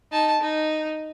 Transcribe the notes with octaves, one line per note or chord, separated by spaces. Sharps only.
D#4 A5
D#4